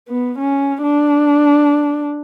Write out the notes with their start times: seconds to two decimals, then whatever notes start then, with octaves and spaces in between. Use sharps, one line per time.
0.09 B3
0.39 C#4
0.83 D4